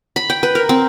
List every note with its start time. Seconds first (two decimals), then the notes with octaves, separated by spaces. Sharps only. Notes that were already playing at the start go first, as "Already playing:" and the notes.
0.16 B5
0.30 G5
0.43 B4
0.55 A#4
0.69 C4